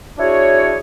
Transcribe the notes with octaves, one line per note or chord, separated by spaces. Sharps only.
D4 E4 F#4 G#4 C#5